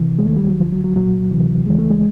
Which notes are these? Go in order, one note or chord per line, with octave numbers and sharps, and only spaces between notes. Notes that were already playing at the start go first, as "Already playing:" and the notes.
Already playing: C3 E3
G#3
D#2 D#3 A3
G3
F#3
D2 D3 F3
F#3
F#3
C2 A#2 F#3
D2 C3 E3
D#2 C#3 E3 G#3
A3
G#3